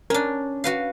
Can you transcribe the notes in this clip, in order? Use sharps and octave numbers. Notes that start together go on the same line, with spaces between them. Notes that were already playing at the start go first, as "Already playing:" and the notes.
C#4 D4 A#4
F#4 B4 F5